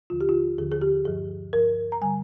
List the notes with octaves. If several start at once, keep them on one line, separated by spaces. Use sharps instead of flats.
D#2 D3 F3 F4
G4
F4
D#2 D3 F3 G#4
G#4
G4
G2 F3 G#4
G2 F3 A#4
A#5
D3 G3 G#5